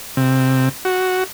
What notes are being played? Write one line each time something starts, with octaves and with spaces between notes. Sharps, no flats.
C3
F#4